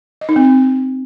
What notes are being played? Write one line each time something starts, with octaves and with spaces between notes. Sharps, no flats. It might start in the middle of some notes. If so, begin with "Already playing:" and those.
D#5
D#4
C4